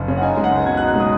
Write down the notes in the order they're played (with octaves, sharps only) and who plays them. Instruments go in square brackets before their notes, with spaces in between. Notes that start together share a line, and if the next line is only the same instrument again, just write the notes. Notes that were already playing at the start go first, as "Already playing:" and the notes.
Already playing: [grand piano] F#1
C#3
F#5
D#4 G#5
G#3
F#5
C#2
B2 G#6
F#6
D#4
F#6
G#3 D#6